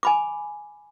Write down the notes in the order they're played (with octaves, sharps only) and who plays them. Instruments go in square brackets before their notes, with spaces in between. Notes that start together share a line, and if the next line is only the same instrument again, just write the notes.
[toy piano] G#5 B5 D6